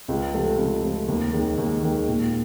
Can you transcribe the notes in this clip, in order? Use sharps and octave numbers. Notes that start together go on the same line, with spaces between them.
C#2
C3 F3 A3
C#2
C3 F3 A3
D#2
D#3 G#3
D#2
D#3 G#3
A#2